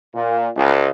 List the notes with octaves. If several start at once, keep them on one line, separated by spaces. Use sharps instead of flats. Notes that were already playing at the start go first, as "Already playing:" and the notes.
A#2
C#2